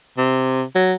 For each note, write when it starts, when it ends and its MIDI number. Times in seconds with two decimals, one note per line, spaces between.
0.18 0.63 48
0.75 0.94 54